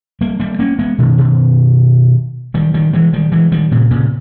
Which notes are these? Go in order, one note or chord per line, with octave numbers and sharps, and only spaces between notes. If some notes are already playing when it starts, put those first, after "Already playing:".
G3 A#3
G3 A#3
A#3 C#4
G#3 B3
B2 D#3
B2 D#3
D#3 G3
D#3 G3
E3 G#3
D#3 G3
E3 G#3
D#3 G3
A#2 C#3
A#2 C#3